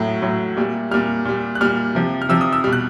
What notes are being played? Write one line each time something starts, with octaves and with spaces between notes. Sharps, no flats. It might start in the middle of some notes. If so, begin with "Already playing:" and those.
Already playing: A2 F#3
A2 F#3
A#2 G3
A#2 G3 F6
A#2 G3
F#6
A#2 G3 F6
C3 F3
F6
C3 F3 E6
D#6
E6
B2 G3 F6
F#6